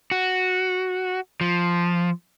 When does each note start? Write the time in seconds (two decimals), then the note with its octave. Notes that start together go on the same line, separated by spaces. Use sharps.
0.11 F#4
1.41 F3